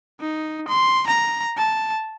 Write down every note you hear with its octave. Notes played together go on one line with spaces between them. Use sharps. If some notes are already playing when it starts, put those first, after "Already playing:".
D#4
C6
A#5
A5